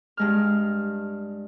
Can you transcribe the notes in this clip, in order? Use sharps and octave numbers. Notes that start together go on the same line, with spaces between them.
G2 G#3 F6